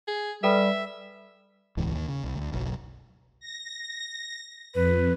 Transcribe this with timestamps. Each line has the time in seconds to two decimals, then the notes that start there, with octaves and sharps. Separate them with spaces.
0.08 G#4
0.44 G3 A4 B4 E5 G5
1.77 D#1 C#2 G#2 E3
1.92 D#2
2.08 C#3
2.24 C2
2.35 D2
2.53 F#1 B1 F#2
3.40 A#6
4.74 F2 B4